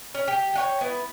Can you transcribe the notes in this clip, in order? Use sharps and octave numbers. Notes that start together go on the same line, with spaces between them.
C#4
G4
C#5 F#5 G5
B3 E4